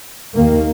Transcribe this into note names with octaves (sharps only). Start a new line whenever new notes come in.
D#2 D#3 A#3